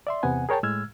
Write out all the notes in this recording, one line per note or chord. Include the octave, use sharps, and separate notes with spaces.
D5 E5 C6
E2 C3 B3 F#5 G#5
G#4 A#4 C#5 G5 A5
A2 G#3 E6 F6 G#6